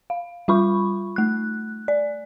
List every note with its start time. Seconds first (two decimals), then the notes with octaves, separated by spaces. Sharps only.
0.10 F5
0.48 G3 F4 B5 C#6
1.16 A3 F#6
1.88 D5